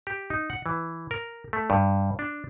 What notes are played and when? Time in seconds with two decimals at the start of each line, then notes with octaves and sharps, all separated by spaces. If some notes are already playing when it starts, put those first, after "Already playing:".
0.07 G4
0.30 D#4
0.50 F#5
0.66 E3
1.11 A#4
1.53 A3
1.70 G2
2.19 D4